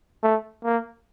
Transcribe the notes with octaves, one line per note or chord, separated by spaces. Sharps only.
A3
A#3